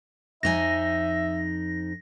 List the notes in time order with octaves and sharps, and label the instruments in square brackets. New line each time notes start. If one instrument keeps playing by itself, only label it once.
[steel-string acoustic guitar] F2 D#4 G#5 [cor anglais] E5 [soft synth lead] A#6